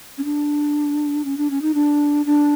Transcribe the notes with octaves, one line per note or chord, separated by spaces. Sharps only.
C#4
D4
C#4
D4
C#4
D#4
D4
D4